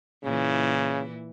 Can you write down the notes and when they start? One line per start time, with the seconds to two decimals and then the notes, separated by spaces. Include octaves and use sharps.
0.23 A#2 C#3 E3 E4